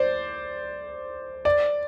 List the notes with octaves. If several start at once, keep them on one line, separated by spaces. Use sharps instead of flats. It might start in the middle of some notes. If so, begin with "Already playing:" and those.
Already playing: C5 D5
D5